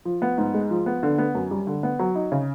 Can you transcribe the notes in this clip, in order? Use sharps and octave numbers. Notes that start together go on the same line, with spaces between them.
F3
B3
G#2
G#3
F3
B3
D3
B3
F#2
G3
D3
B3
F#3
D#4
C#3